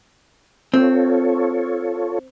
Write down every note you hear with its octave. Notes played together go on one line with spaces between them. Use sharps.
C4 F4 A4 C#5